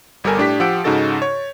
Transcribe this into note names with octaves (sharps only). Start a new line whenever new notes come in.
G1 G3 G4 A4 A#4 G#5
A2 D4 G4 B6
F3 G4 F#5 E6 G6 D7
G#2 C#3 D#4 F#4 A4 A6
C#5